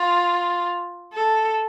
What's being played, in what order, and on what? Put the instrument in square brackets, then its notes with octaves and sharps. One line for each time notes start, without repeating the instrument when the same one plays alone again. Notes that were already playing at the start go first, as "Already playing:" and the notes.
Already playing: [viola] F4
A4